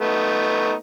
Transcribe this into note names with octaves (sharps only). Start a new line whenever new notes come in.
A3 B3 D#4